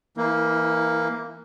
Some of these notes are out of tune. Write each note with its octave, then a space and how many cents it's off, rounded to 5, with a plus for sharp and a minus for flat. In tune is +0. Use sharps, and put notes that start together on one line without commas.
E3 +0 A#3 +0 E4 -40